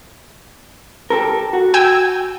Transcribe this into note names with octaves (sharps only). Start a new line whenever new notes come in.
G4 A4 A#4
F#4
G5 G#5 E6